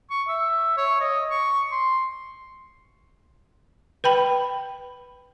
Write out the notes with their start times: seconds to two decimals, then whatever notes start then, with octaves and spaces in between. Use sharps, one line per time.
0.11 C#6
0.28 E5
0.77 C#5
1.01 D#5
1.31 C#6
1.72 C6
4.04 B4 G5 B5